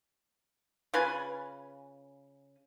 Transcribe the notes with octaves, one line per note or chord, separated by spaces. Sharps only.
C#3 F4 B4 G#5